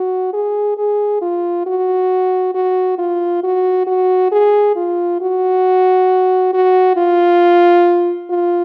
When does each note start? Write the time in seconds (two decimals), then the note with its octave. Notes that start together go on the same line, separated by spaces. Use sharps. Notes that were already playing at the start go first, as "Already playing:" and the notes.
Already playing: F#4
0.34 G#4
0.77 G#4
1.21 F4
1.66 F#4
2.54 F#4
2.99 F4
3.44 F#4
3.87 F#4
4.32 G#4
4.76 F4
5.21 F#4
6.53 F#4
6.97 F4
8.30 F4